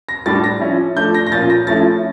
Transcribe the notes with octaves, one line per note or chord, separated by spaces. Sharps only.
A#6
A2 G3 D4 A6
A#6
F3 C#4 E4
F3 A3 D4 G6
A#6
A#6
A#2 F3 C#4 F4 A6
A#6
F3 A3 C#4 E4 A6